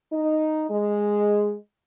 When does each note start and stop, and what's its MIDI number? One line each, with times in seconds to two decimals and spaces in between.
0.12 0.65 63
0.70 1.54 56